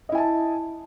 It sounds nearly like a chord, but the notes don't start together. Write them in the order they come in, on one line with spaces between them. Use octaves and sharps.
D#5 E4 G#5 A5